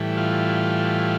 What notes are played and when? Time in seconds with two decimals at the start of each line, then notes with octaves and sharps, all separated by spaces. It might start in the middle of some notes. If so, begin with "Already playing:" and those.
Already playing: A2 E3 G3
0.17 F4